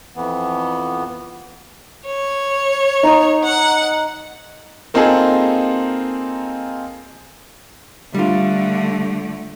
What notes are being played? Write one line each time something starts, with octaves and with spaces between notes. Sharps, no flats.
F2 E3 B3
C#5
D#4
F#5
A#3 C4 D#4 F4 G#4 A4
D3 G3 A3 D4 F4